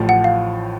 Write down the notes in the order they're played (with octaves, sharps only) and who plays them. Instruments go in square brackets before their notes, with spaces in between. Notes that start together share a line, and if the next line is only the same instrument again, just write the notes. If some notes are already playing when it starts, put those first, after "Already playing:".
Already playing: [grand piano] A1 A2 F3
[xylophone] F#5
F5